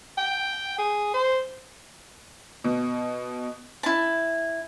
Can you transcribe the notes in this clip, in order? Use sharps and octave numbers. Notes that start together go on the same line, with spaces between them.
G5
G#4
C5
B2
E4 A5